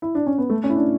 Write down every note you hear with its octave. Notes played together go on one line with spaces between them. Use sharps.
E4
D4
C#4
B3
A3
C#4
E4
D4